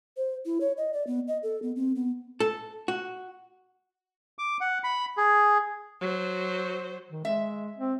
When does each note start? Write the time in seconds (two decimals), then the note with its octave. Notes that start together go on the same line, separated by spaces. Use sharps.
0.17 C5
0.46 E4
0.61 C#5
0.77 D#5
0.93 D5
1.07 B3
1.28 D#5
1.43 A4
1.62 B3
1.76 C4
1.95 B3
2.40 A4
2.88 F#4
4.39 D6
4.61 F#5
4.84 B5
5.17 G#4
6.01 F#3 C5
7.11 D#3
7.25 G#3 E5
7.78 C4